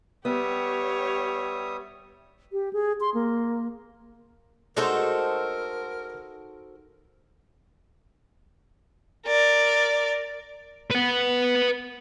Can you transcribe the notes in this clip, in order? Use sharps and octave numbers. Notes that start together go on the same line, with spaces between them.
G3 B3 G4 C#5 E5 D#6
G4
G#4
C6
A#3
G#3 A3 D4 D#4 F#4 A4 A#4 C5
A#4 D5
B4 F#5